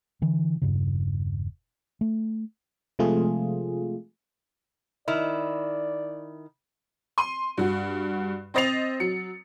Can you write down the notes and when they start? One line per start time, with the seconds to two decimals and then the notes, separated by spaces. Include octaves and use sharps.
0.22 D3 E3
0.62 E1 G2 C#3
2.01 A3
2.99 C3 F3 G#3 A3 F4 G#4
5.08 D#3 E4 D5
7.18 C6 D#7
7.58 G2 F#4
8.54 C4 C5 D#5 A6 C7 F7
9.00 F#3 C#7